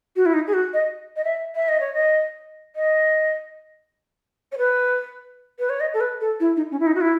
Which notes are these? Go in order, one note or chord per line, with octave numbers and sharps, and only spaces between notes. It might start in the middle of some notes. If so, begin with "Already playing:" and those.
F#4
E4
D#4
G#4
F#4
D#5
D#5
E5
E5
D#5
C#5
D#5
D#5
C#5
B4
B4
C#5
D#5
A4
B4
A4
E4
D#4
C#4
E4
D#4
F#4
E4